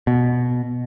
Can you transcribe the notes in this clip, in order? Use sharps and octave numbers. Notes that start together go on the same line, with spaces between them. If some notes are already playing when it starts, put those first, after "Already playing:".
B2